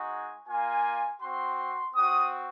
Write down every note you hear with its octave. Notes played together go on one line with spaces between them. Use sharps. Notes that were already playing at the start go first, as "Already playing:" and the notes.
Already playing: G#3 D#4 F#4 G#5
A#3 F4 G#5
C4 F#4 C6
C4 F#4 D#6